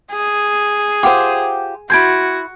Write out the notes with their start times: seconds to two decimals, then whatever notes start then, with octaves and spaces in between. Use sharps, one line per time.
0.12 G#4
1.03 F4 G4 C5 F#5 G5 D6
1.90 E4 F#4 G#4 C6 G6 G#6 D7